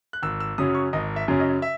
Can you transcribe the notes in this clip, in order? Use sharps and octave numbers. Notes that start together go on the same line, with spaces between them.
F#6
G#1 E6
E6
F#2 C#3 F#3 C#4 D#6
C#6
G#1 D#5
E5
F#2 C#3 F#3 C#4
D#5
E5